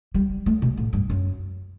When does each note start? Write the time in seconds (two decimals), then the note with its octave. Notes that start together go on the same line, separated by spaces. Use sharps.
0.14 G3
0.46 A3
0.62 B2
0.77 A2
0.93 G2
1.10 F#2